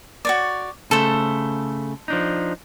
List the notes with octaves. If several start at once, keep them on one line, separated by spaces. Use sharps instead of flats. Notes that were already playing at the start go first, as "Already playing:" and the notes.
F#4 C#5 D5
C#3 A3 A4 C5
F3 D4 D#4